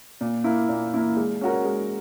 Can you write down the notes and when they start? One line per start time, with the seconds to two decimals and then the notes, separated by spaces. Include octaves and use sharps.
0.21 A#2
0.44 A#3 E4
0.69 A#2
0.94 A#3 E4
1.17 G#3
1.41 C#4 F#4 A#4
1.65 G#3